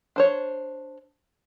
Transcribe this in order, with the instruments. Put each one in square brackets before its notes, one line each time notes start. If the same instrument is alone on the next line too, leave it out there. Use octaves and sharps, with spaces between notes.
[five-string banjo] D4 C5 C#5